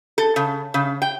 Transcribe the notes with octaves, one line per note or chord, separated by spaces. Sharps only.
A4
C#3
C#3
G5